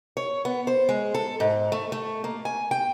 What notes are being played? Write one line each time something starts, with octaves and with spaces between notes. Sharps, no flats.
C#5
B3
C5
G#3
A4
G#2
A3
A3
A#3
G#5
G5